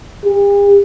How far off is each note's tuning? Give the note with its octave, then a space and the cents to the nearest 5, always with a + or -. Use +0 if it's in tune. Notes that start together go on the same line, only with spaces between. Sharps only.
G4 +45